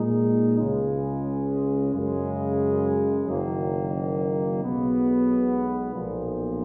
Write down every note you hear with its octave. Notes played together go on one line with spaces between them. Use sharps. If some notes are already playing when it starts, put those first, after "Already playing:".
Already playing: A#2 G#3 D#4
C#2 C#3 G#3
F#2 C#3 G#3
F#1 F#2 D#3 A#3
B1 B2 G#3 B3
B1 A#2 F3